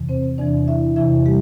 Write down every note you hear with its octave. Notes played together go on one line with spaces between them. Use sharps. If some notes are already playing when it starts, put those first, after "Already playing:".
Already playing: E2 C3 E3
C4 C5
E2 C3 E3 D4 D5
E4 E5
E2 C3 E3 E4 E5
G3 G4